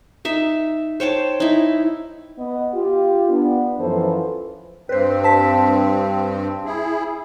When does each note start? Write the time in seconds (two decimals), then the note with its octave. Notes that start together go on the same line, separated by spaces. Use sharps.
0.25 D#4 E5
1.00 C5 C#5 G5 A5
1.40 D#4 E4
2.37 B3 D#5
2.74 F4 G4
3.29 B3 D4
3.79 F#2 E3 F3 A4 B4 C5
4.89 G2 C4 B4 C5
5.23 C5 A5 B6
6.65 E4 G#4